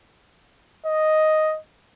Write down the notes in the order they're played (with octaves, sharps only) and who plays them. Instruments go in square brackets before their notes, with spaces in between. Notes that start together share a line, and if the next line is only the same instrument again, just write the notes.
[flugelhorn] D#5